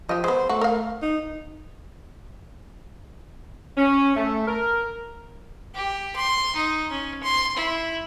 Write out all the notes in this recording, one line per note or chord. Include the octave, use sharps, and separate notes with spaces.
F3 G4 D#5
G#3 B3 C5
A3 F#4
A#4 F5
D#4
C#4
A3
A#4
G4
C6
D#4
C#4
C6
E4